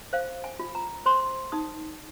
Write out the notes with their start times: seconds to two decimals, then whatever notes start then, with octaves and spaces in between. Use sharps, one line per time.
0.13 C5 F5
0.44 G#5
0.59 F4
0.75 A#5
1.06 C5 C6
1.52 D#4 D#6